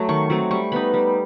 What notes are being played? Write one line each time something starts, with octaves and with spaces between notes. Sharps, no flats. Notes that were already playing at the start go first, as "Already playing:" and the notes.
Already playing: F#3 A3
D#3 C#6
F#3 A3 C4
G3 C#6
B3 D#4 B5
G3